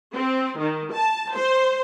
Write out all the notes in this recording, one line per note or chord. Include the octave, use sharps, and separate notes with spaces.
C4
D#3
A5
C5